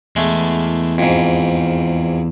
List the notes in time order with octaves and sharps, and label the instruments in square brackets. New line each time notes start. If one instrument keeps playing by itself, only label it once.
[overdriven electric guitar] E2 [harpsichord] G#3 A3
[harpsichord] F2 G#2